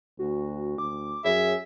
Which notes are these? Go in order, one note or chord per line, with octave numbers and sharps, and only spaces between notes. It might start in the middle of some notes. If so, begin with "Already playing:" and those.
D2 F#4
D2 D6
F#2 G#4 C#5 E5